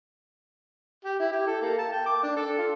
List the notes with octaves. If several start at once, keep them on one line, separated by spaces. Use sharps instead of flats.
G4
E4
G4
A4
A#3
A5
G5
D6
D4
A4
F4